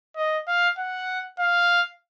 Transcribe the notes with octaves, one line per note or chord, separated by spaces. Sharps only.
D#5
F5
F#5
F5